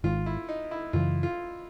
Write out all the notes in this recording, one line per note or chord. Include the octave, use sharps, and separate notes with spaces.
G#1 G#2 D#3 F4
E4
D#4
E4
F#2 C#3 E3 F4
F4